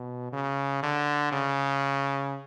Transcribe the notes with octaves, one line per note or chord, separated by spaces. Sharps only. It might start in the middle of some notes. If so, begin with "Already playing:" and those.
Already playing: B2
C#3
D3
C#3